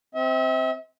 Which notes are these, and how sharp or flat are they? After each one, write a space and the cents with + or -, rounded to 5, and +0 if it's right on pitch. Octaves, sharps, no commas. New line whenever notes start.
C4 +0 E5 -40